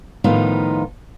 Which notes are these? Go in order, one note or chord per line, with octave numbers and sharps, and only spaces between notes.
A2 D#3 F3 B3 D#4 F4